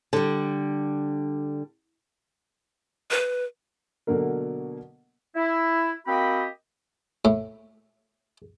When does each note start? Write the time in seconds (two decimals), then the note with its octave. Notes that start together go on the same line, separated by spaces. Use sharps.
0.13 D3 G3
3.11 B4
4.07 B2 D3 F#3 A#3 A#4
5.36 E4
6.07 A#3 C4 F#4 G4 D#5 B5
7.25 A2